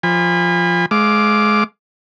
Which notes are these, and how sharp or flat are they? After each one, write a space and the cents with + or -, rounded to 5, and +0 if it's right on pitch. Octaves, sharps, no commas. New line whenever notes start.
F3 +0 G#5 -40 B5 +0
G#3 +25 F5 +0 D6 +0